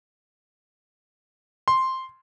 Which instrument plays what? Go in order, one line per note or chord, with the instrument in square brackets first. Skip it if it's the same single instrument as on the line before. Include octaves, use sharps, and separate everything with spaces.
[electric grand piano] C6